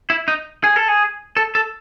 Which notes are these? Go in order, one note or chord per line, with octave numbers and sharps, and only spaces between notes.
E4
D#4
G#4
A4
G#4
A4
A4